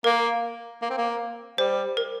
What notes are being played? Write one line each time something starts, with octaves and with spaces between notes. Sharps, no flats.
A#3 A#4
A#3
C4
A#3
G3 C5
A#4